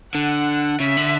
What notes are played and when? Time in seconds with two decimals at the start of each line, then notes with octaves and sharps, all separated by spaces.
0.14 D3 F#5
0.80 C#3 E5
0.97 D3